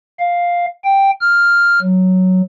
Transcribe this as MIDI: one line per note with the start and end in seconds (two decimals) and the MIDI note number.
0.20 0.66 77
0.85 1.11 79
1.21 1.80 89
1.82 2.41 54